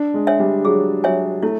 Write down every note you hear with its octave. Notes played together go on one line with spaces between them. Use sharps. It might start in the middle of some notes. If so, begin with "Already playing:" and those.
Already playing: D4
G#3
C#5 E5 G#5
G3
F#3 G#4
F#3 C#5 E5 G#5
A3 E4